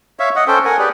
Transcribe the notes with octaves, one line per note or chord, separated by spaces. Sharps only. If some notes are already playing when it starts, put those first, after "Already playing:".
C#5 E5 F5
D#5 F#5
C#4 A4 C5 G5
A#4 F#5 G#5
G4 G#4 B4 D5